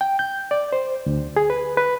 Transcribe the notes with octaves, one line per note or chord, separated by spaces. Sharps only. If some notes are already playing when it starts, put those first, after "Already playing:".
G5
G6
D5
C5
D2
G#4
B4
B4